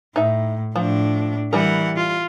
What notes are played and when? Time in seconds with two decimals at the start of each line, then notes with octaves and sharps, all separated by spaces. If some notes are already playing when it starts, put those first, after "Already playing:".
0.16 A2 D#4 E5
0.76 A2 F3 D4
1.53 E3 G3 A#4 F#5
1.96 F4